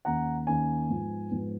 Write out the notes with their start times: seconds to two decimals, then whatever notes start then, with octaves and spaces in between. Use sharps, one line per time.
0.05 D#2 D#3 A#3 C#4 F#5 A#5
0.47 D#2 D#3 A#3 C#4 G#5
0.90 G#2 F3 B3
1.31 G#2 F3 B3